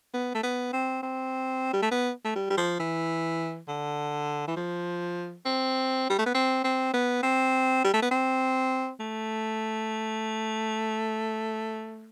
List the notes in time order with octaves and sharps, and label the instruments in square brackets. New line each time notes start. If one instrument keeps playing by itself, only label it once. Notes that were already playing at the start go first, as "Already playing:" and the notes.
[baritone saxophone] B3
A3
B3
C4
C4
G3
A3
B3
A3
G3
G3
F3
E3
D3
E3
F3
C4
G3
A3
B3
C4
C4
B3
C4
G3
A3
B3
C4
A3